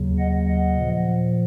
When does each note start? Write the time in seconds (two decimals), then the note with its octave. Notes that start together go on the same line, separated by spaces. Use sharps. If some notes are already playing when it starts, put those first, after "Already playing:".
Already playing: D#2 C#3 F#3
0.19 D#5 F#5
0.47 D#5 F#5
0.75 A#2 F3